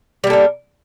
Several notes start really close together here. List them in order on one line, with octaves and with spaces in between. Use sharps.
G3 A#3 A4 A#4